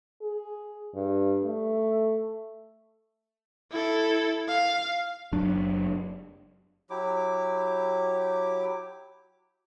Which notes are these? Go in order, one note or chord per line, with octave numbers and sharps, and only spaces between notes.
G#4
G2
A3
E4 A4
F5
F#1 F#3 D4
F#3 E4 G4 D6